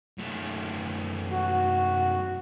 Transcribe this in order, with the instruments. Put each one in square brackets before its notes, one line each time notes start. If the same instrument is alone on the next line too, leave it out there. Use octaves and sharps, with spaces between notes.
[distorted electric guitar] F#2 A3
[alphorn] F#4